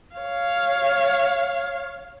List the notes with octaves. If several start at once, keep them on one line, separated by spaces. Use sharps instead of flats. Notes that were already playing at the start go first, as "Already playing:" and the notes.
C#5 F5